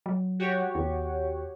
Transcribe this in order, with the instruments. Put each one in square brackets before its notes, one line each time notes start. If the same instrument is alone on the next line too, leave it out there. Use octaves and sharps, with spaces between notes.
[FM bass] F#3
[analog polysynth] F#4 G4 C#5
[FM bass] D#2